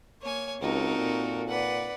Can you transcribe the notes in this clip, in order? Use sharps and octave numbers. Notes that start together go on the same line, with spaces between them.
A#3 C#5 G#5
C#2 C4 D#4 F#4 A4 A#4
A#2
B4 D5 F#5